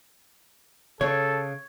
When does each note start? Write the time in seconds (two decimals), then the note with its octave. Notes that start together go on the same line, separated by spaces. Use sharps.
1.01 C#3 A4 C#5